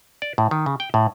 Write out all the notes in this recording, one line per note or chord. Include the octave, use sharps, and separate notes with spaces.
D5
A2
D#3
C#3
G5
A2